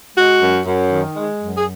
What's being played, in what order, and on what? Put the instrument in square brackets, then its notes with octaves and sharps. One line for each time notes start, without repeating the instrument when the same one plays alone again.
[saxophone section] G#3 F#4
F#2
F#2
D#3
G#3
F#2
G#4